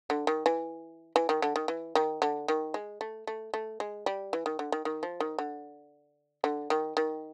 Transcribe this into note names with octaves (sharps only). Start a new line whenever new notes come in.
D3
D#3
E3
E3
D#3
D3
D#3
E3
D#3
D3
D#3
G#3
A3
A3
A3
G#3
G3
E3
D#3
D3
D#3
D#3
F3
D#3
D3
D3
D#3
D#3